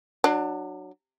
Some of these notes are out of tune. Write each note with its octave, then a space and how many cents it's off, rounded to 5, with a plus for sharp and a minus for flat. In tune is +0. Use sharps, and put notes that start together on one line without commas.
F#3 +0 D4 +30